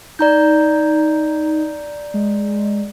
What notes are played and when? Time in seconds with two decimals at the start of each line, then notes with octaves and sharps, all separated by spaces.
0.19 D#4 D5 A#5 G6
2.14 G#3